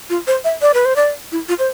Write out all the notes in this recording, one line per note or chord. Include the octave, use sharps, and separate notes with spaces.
F4
C5
E5
D5
B4
C5
D5
E4
F4
C5